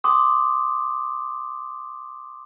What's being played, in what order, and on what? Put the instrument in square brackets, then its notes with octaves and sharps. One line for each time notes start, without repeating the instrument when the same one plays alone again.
[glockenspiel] C6 D6 D#6